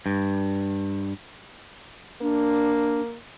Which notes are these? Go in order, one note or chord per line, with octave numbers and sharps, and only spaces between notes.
G2
A#3 D4